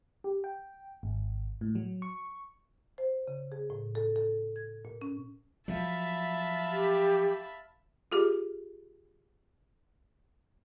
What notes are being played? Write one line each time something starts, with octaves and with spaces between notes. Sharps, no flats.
G4
G5
G#1
A2
F#3
C#6
C5
C#3
G#4
A2
A4
A4
G#6
A#2
C#4
F3 F#3 E5 F5 A5 B5
G4
F4 G4 G#4 D6